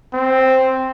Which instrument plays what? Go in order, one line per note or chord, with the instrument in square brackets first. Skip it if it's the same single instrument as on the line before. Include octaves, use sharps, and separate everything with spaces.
[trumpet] C4